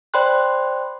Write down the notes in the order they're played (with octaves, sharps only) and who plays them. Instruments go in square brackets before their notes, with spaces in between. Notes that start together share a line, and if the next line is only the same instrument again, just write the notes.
[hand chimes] C5 D5 G5 B5 C6 F#6